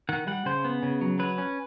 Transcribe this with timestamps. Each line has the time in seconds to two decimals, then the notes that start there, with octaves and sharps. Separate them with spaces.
0.09 D#3 F#5
0.27 G3 F#5
0.45 C#3 C5
0.65 B3
0.83 C#3
1.01 F#3
1.19 F#3 B4
1.38 C#4